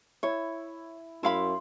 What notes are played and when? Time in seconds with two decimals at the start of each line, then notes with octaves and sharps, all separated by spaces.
0.23 E4 C#5 E6
1.23 F#2 E4 E5 F5 B5 C6